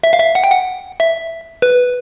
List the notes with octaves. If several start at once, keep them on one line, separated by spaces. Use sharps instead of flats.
E5
F5
E5
F#5
G5
F#5
E5
B4